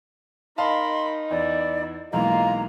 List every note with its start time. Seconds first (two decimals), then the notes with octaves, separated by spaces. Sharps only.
0.58 D#4 A#4 D#5 F5 A5 B5 C6
1.31 E2 E4 D5
2.13 B1 E3 G#3 A#3 F4 A#5